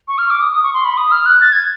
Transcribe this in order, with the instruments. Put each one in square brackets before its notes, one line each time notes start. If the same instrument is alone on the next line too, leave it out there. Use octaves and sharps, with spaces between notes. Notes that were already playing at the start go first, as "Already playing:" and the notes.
[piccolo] C#6
F6
D6
D#6
D#6
C#6
C6
B5
D#6
F6
F#6
A6
G#6